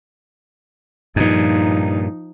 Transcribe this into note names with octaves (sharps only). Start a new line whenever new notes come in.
G2 A#2 F3 D#4